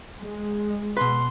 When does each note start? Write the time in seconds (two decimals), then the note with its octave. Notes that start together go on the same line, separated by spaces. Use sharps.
0.19 G#3
0.97 B2 B4 C6